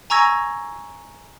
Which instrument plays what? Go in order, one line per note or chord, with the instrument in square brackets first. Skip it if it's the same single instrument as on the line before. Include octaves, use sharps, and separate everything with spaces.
[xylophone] G#5 A#5 C#6 E6 G#6 A#6